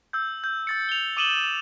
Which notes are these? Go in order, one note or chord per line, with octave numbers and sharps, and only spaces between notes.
E6 G6
G6
E6 A6 C#7
F7 G7
D6 D#6 D#7 E7 F#7 G7